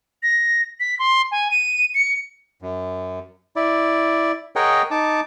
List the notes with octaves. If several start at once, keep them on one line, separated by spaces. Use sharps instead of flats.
A#6
B6
C6
G#5
D#7
C#7
F#2
E4 D5
G#4 A#4 C#5 D#5 F#5 G5
D#4 A5 D6